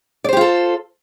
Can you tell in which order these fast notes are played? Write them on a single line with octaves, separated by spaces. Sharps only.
D5 C5 G4 F4 A4